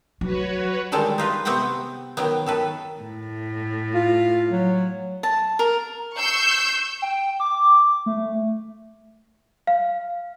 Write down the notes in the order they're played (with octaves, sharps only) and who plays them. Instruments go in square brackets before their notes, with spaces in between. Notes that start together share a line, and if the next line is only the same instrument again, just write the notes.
[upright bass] F#3 [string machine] F#4 B4 C#5
[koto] D3 D#3 G3 G#3 A4
D#4 F4 B4
C3 B3 C4 F#4 F#5 G5
D#3 F#3 B3
D#3 A4 B4
[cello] A2
[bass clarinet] F4
F#3
[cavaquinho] A5
A#4
[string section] C#6 E6 G6 C7
[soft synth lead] G5
D6
A3
[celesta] F5